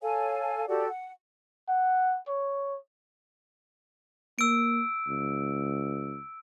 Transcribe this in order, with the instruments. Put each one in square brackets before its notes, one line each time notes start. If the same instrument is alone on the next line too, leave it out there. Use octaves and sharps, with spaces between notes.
[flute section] A4 C#5 F5 G#5
F#4 G4 A4 D5
F#5
[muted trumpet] F#5
C#5
[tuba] A#3 [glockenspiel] E6 D7
[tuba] C#2